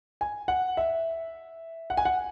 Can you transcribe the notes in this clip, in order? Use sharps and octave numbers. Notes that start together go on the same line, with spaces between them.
G#5
F#5
E5
F#5
G#5
F#5